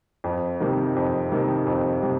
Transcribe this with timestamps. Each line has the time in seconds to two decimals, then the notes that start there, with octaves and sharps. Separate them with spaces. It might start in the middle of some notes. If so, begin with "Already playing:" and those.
0.24 F2
0.60 C3 D#3
0.96 F2
1.32 C3 D#3
1.67 F2
2.03 C3